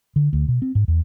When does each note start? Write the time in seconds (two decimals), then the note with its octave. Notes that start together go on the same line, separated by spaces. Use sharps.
0.16 D3
0.33 D2
0.48 B2
0.62 C4
0.75 G#2
0.88 E2